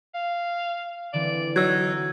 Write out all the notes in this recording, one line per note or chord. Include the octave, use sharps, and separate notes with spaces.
F5
D3 E3 C4 D5
F#3 D#4 E6 G#6